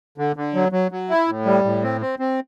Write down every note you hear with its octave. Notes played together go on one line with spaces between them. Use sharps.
D3
D3
F#3
F#3
F#3
E4
A2
G3
A2
C4
C4
C4